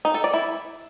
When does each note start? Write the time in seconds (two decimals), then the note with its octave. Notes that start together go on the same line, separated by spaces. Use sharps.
0.05 D#4
0.14 A4
0.24 D5
0.34 E4